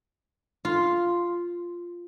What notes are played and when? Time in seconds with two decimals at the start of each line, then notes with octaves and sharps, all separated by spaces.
0.65 F4